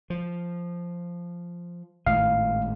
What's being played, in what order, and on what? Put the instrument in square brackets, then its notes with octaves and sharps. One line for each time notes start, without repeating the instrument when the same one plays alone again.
[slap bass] F3
[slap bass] G#1 A2 G#3 [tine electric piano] F5